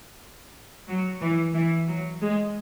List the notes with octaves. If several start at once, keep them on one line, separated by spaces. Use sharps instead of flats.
F#3
E3
E3
F#3
G#3